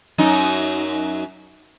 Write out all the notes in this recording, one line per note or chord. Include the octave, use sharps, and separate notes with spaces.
F#2 F#3 D#4